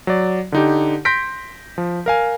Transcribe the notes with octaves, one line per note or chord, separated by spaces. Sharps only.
F#3 D5
D3 D#4 G4
C6 G6 A#6 B6 D7
F3
A#4 F5 G#5